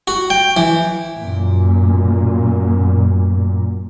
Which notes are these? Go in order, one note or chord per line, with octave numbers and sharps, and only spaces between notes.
F#4
G5
E3
F#2 A#2